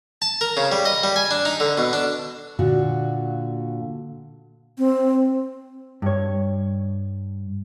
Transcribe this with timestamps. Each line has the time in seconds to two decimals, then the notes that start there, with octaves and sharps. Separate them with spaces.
0.22 A5
0.41 A#4
0.57 C#3
0.72 G3
0.85 D#5
1.03 G3
1.16 G#5
1.31 D4
1.45 D#4
1.60 D3
1.78 B2
1.93 D4
2.59 A#2 D3 F#4
4.78 C4
6.02 G2 C#5